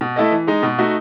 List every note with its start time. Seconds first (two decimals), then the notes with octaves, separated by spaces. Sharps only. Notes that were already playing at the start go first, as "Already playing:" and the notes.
0.01 B2
0.16 A3 E4 A4 D#5
0.32 E3
0.47 G#3 D#4
0.63 B2
0.79 A3 D#4 F#4